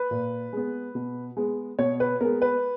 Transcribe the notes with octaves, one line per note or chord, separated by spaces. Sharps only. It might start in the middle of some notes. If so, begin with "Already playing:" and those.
Already playing: B4
A#2
G#3 B3
B2
G#3 B3
B2 C#5
B4
G#3 B3 A#4
B4